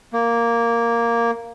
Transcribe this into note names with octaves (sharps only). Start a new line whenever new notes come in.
A#3